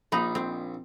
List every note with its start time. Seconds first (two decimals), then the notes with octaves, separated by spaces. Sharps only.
0.12 A#1 D#4 D#5 B5
0.35 C4